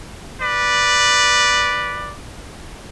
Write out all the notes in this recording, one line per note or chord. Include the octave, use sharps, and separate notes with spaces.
B4 D5